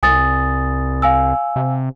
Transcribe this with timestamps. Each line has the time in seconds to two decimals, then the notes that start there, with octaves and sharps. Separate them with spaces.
0.03 C2 G#5 D#6 A6
1.02 F5 G#5 E6
1.56 C3